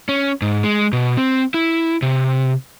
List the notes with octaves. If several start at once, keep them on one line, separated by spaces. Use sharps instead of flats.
C#4
G#2
G#3
B2
C4
E4
C3